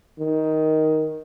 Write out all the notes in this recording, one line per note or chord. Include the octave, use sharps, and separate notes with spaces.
D#3